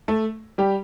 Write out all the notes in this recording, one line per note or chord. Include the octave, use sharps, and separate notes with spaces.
A3 A4
G3 G4